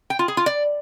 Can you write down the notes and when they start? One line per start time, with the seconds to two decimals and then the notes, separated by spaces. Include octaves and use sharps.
0.10 G5
0.19 F4
0.28 G#4
0.37 F4
0.46 D5